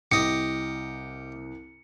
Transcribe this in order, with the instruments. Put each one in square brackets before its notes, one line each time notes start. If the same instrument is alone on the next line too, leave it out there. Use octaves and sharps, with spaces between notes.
[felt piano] C2 [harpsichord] G4 D#5 [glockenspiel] C#7